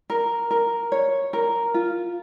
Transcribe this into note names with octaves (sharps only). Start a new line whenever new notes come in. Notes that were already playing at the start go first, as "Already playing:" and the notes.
A#4
A#4
C#5
A#4
F4